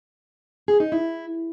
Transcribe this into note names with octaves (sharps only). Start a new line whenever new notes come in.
G#4
D#4
E4